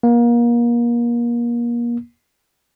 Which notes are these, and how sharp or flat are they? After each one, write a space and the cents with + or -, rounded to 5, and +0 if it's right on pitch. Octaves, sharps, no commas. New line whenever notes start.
A#3 +30